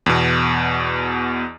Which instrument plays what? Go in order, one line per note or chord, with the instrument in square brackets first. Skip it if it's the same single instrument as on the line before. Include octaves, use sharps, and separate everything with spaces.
[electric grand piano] E2 B2